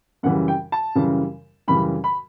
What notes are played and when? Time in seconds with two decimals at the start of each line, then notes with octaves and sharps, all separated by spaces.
0.23 F#2 C#3 E3 G3 F#5
0.48 G5
0.72 A5
0.95 F#2 C#3 E3 G3
1.68 F#2 C#3 E3 G3 B5
2.04 B5